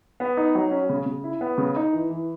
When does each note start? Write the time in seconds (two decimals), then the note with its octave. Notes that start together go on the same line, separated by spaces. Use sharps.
0.20 B3
0.37 D#4
0.55 F#3
0.71 C#4
0.89 C#3
1.06 C#3
1.24 E4
1.41 B3
1.58 C#3
1.76 D#4
1.93 E3
2.10 E3